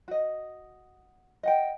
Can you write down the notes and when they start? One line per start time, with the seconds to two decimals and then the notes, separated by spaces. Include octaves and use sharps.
0.08 F#4 D#5
1.43 D#5 F#5 G5